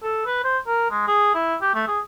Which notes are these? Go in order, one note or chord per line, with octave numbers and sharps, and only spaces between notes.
A4
B4
C5
A#4
G#3
G#4
E4
G4
A3
G#4